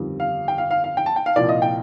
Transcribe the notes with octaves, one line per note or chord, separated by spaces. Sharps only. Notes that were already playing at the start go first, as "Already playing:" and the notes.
Already playing: G1 F2 D#3 G3
F5
G5
F5
F5
F5
G5
A5
G5
F5
C2 A#2 F3 D5
D#5
G5